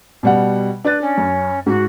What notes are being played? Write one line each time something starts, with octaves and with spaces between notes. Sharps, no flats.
B2 G3 F#5
D4 B4 A6
C#4
F#2
G#2 F#4